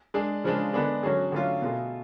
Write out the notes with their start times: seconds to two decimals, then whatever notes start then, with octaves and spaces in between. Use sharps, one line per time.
0.14 G#3 D4 G#4
0.44 C#3 F3 G#3 D4
0.73 D3 G#3 B3 D4 G#4
1.03 D3 F#3 C#4 G#4
1.32 D3 F#3 A3 C#4 F4
1.62 B2 A3 F4 G#4